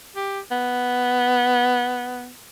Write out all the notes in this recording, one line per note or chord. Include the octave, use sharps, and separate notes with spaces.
G4
B3